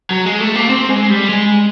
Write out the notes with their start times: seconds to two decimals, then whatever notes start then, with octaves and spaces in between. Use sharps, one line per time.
0.11 F#3
0.25 G#3
0.40 A3
0.55 A#3
0.69 C4
0.89 G#3
1.10 G3
1.29 G#3